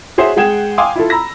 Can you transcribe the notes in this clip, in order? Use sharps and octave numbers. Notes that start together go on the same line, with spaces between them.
F#4 G#4 C5 C#5 E5
G#3 G#4 F#5 G5 G#6 E7
F5 G5 G#5 C6 D6 D#6
E4 F4 A4
A#5 B5 E6 A#6